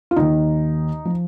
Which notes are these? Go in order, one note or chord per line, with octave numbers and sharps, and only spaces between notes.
F4
D#2 D#3 D#4
F3